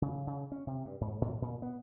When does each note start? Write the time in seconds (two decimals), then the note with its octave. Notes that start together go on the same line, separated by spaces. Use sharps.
0.02 C#3
0.27 C#3
0.52 C#4
0.67 C3
0.85 G2
1.01 G#2
1.21 A2
1.42 A#2
1.62 B3